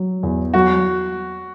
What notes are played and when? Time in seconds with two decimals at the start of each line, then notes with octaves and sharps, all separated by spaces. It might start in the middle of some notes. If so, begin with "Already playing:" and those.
Already playing: F#3
0.23 E2
0.54 F#3 F#4